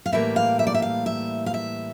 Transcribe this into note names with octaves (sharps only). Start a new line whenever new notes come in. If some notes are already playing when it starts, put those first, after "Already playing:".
F5
A2 E3 G3 A#3 E5
F5
E5
D5
E5
F5
E5
F5
E5